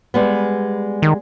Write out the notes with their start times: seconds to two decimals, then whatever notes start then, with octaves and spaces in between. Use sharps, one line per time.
0.14 G3 G#3 B3
1.02 D#3